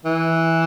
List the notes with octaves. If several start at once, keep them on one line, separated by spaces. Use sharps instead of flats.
E3